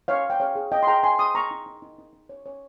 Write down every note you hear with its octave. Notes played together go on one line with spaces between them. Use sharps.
D#4 C#5 F5
C#5 G5
G#4 C#5 F5
G#4
D#4 D#5 G5
C6
G#4 G5 A#5
D#4 G#5 C6
G#4 C6 D#6
G#4 A#5 C#6
D#4
D#4
D#4
D#4
D#4
C#5
C#5